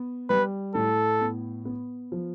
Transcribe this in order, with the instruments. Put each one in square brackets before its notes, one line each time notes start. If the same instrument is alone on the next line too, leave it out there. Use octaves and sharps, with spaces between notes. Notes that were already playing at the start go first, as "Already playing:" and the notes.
Already playing: [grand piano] B3
[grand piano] G3 [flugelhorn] B4
[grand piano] A2 [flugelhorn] A4
[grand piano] B3
B3
F3